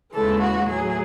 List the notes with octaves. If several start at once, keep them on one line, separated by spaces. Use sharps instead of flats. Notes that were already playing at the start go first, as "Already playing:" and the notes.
D#2 C#3 E3 G#3 A4
F#4
A2 F#3 G#4